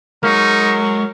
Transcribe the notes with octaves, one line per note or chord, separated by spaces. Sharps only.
F#3 G#3 D#4 A#4 C#6